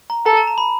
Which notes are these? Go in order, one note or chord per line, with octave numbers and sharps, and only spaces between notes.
A#5
A4 A#5
A5
A#5
B5